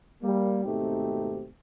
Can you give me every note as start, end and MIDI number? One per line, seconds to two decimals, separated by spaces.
0.22 0.64 55
0.22 0.64 58
0.65 1.48 32
0.65 1.48 47
0.65 1.48 57
0.65 1.48 60
0.65 1.48 63
0.65 1.48 67